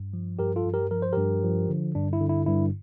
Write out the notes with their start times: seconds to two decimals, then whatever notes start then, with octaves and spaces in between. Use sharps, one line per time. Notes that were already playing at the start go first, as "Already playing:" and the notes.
Already playing: G2
0.13 F3
0.39 G2 G4 A#4
0.56 F4 A4
0.65 G2
0.74 G4 A#4
0.91 F3 A#4
1.02 C5
1.13 G2 G4 A#4
1.43 F3
1.69 D3
1.95 G2 D4
2.13 E4
2.21 D3
2.29 E4
2.46 G2 E4